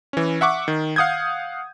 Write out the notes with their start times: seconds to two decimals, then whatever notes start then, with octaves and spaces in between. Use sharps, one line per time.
0.13 E3 C#4
0.41 E5 F#5 C#6 D6
0.68 D#3
0.96 F5 F#5 D#6 G6 G#6